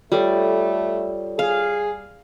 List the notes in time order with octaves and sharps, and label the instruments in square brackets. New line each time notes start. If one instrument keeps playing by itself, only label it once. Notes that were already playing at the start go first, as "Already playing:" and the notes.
[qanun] G3 [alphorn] A3 [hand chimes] F4 A4 C#5
[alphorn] G#4 [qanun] F5